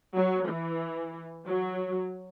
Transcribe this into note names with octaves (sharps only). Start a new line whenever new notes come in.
F#3
E3
F#3